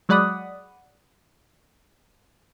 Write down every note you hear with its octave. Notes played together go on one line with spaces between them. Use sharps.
F#3 G#3 D5 F#5 B5 D#6